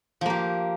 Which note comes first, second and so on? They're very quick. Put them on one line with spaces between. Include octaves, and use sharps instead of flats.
F3 A#3 G4